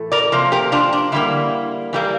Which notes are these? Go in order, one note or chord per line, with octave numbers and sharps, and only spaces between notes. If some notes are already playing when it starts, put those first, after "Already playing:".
Already playing: A2 E3 A3
A#4 D5
C3 F3 A#3
G4 A#4
D4 F4
D4
D3 G3 A#3 E4
E3 G3 A#3